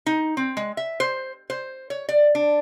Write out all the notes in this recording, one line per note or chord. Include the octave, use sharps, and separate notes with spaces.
D#4
C4
G#3
E5
C5
C5
C#5
D5
D4